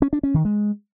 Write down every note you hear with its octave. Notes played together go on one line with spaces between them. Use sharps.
C#4
D4
C#4
D#3
G#3